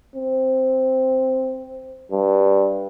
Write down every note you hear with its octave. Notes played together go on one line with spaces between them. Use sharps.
C4
G2